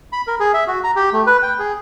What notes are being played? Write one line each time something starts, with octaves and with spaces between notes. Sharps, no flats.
B5
A#4
G#4
E5
F#4
A#5
G4
A3
B4
G5
G#4